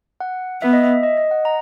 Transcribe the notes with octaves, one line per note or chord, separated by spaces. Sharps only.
F#5
B3 E5
D#5
E5
D#5
D#5
F#5
A#5